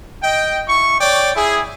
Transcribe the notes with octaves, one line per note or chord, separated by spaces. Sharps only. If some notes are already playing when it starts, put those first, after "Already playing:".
D#5 G5
E4 C#6
C#5 D5 G5
E4 G#4